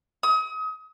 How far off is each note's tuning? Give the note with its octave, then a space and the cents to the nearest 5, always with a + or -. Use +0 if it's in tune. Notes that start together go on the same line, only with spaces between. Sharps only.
D#6 +35